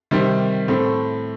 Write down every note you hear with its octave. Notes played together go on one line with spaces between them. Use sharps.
C3 D#3 G3 C4
A2 A3 C4